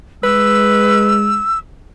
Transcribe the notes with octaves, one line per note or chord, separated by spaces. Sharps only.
G#3 B4 E6